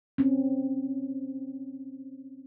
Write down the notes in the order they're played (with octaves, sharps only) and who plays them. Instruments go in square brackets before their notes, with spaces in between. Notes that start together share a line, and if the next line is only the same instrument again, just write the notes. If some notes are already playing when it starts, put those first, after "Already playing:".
[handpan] C4 C#4